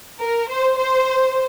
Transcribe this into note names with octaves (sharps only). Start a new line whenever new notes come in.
A#4
C5
C5